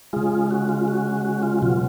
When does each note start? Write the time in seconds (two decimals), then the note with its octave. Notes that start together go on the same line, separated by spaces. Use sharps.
0.13 C#3 G#3 F4 G#4
0.51 F#4
0.69 F4
0.88 F#4
1.25 F#4
1.43 F4
1.62 B2 F#3 F4